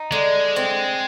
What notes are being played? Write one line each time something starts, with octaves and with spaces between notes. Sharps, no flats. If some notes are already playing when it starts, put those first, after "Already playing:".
Already playing: D#4
D3 G#3
C4